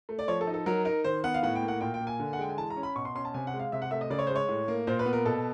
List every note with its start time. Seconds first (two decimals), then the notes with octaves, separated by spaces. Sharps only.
0.09 A3
0.19 D5
0.28 F3 C#5
0.41 A4
0.47 D#4
0.54 A4
0.66 F#3 A#4
0.85 D#4 A#4
1.04 D#3 C5
1.24 B3 F#5
1.34 F5
1.43 A2 F#5
1.55 G5
1.63 A#3
1.68 F#5
1.81 A#2 G5
1.94 G5
2.00 A#3
2.07 G#5
2.20 D3
2.33 F#5
2.39 G#3 G5
2.49 G#5
2.57 E3 A5
2.70 A#5
2.76 C#4
2.83 B5
2.96 B2 C#6
3.05 C6
3.15 C#4 C6
3.25 A5
3.34 C3 G#5
3.47 F#5
3.54 G#3
3.59 F5
3.72 C3 E5
3.82 F#5
3.91 A3 E5
4.01 D#5
4.10 C#3 D5
4.19 C#5
4.27 C5
4.30 G#3
4.36 C#5
4.49 A2
4.68 A#3
4.87 A#2 C5
4.99 B4
5.06 B3
5.13 A#4
5.25 B2 A4